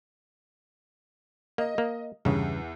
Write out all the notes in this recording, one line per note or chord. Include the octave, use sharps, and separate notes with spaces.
A#3 D#5
A#3
E2 G2 C#3